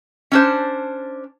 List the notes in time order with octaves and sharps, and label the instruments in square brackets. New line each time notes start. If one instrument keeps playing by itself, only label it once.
[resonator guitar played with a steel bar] C#4 D4 C5